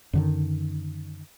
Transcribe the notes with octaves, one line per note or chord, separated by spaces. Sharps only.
F#2 D3 D#3